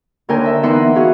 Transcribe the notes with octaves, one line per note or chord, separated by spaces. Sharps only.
D#2 D3 A#4 G5 G#5
E5
E3 B3 D#4 E5 F#5 C6
F#4 G#4 F5